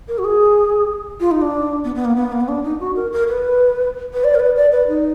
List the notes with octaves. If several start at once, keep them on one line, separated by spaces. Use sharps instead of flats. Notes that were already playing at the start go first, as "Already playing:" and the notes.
A#4
F#4
G#4
F4
D#4
D4
B3
B3
A#3
B3
A#3
B3
D4
D#4
F#4
A#4
A#4
B4
B4
D5
A#4
B4
D5
B4
D#4